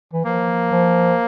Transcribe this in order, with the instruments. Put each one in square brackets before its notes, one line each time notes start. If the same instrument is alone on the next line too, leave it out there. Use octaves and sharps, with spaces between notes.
[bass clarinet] E3
[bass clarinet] F3 [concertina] A#3
[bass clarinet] F3